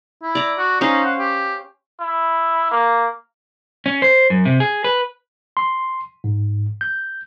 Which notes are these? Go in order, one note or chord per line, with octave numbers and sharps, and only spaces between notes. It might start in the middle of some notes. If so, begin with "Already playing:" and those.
E4
D5 A#5
F#4
C#4 D#4 C5 F5
F#5
G4
E4
A#3
C#4
C5
F#2
C3
G#4
B4
C6
G#2
G6